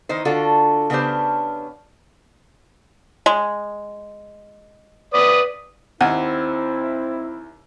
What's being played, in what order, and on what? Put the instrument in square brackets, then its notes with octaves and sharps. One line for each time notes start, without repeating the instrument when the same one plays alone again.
[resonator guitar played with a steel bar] D#3 E3 D#4 C5
D3 F4 F#4 A4
C#3 B3 C#4 D4 G4 C5
[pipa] G#3
[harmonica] B4 D5 D#6
[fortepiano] D#2 [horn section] C4 E4 [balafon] F#5